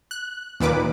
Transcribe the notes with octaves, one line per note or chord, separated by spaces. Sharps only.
F#6
D#2 A#2 D#3 B4 D6